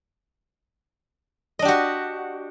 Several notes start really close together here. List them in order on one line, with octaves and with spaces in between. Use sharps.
D#5 D4 G4 F#4